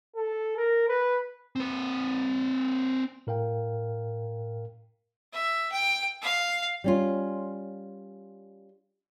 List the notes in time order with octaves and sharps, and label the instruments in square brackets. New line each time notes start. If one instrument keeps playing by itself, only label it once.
[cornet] A4
A#4
B4
[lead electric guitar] C4 B4
[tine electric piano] A2 A#4 F5 G5
[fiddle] E5
G5
F5
[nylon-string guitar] G3 C#4 F4